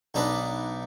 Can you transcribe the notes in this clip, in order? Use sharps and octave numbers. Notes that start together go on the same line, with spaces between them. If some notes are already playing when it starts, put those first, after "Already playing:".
B1 D4 D#4 B4